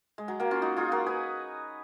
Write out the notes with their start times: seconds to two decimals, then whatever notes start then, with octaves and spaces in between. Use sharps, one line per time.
0.18 G#3
0.28 F#3
0.40 F#3 A#3
0.51 C#4 F4
0.62 D#4 F#4
0.77 F4 G#4
0.92 F#4 A#4
1.06 G#4 B4